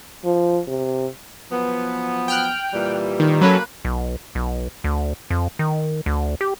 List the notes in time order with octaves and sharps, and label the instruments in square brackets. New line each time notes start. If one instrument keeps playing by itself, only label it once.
[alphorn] F3
C3
[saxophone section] F3 F#3 B3
[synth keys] G5 F6 F#6
[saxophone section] A#2 E3 G3
[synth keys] D#3
[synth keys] F#3 C#4 A4 [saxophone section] A#3 B4
[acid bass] B1
B1
D2
F2
D#3
D2
G4